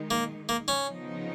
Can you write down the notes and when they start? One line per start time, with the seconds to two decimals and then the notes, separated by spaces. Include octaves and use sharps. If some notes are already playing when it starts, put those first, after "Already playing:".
Already playing: D#3 G#3 D#4
0.11 A#3
0.49 A#3
0.68 C#4
0.87 C#3 F3 B3 D#4